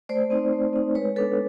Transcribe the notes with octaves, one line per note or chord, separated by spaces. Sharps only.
A3 C5 D5
C4 D#4
A3
C4 D#4
G#3 B4 C#5
B3 D4 A4 B4